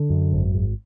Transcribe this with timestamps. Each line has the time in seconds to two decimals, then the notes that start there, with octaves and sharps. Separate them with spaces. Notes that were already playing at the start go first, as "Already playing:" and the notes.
Already playing: D3
0.10 F#2
0.32 G#1
0.54 G#1